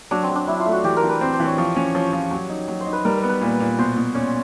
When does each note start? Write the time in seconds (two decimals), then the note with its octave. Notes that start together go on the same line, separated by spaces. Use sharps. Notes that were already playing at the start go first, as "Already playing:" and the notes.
0.11 F#3 D4
0.23 C4
0.29 F#3
0.35 D4
0.47 F#3 E4
0.60 F4
0.66 A3
0.72 F#4
0.84 E3 G4
0.97 A#4
1.03 E3
1.09 B4
1.21 C4 C5
1.33 C5
1.40 E3
1.46 C#5
1.58 F3 C#5
1.76 C#4
1.95 F3 C#5
2.13 F3
2.31 F#3
2.50 D#4
2.68 F#3
2.81 C5
2.86 D#4
2.93 B4
3.05 G3 A#4
3.17 B4
3.23 B3
3.29 B4
3.41 A#2
3.60 A#2
3.78 B2 C5
3.97 B2
4.15 C#4 D5